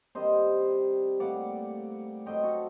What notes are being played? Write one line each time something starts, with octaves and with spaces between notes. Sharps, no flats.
C3 D#3 G3 C5 D#5
A2 G3 A#3 D5 F#5
A2 F#3 A3 C4 D#5 G5
F#4 A4